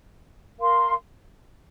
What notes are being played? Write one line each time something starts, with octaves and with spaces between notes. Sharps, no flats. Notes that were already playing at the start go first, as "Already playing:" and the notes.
A#4 F5 C6